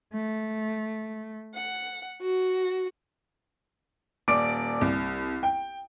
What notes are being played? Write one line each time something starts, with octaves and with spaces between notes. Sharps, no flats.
A3
F#5
F#4
D#1 D5 D6 D7
C2
G5